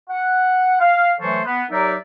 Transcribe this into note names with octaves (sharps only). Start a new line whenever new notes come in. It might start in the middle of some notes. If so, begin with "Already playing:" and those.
F#5
F5
E3 F#3 A3 A4 C5 C#5
B3
F#3 D#4 G4 A#4 D5 E5